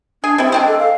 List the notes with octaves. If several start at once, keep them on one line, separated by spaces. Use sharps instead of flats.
D4 G#4
G3 C4 E4
G#3 C4 D4 G5
A4
F5